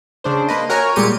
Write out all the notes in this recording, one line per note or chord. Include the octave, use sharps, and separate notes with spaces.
C#3 D4 C5
A#3 B4 D#5
F#4 A#4 C#5 G#5 A#5
A#2 G3 G#3 G4 C#7 D#7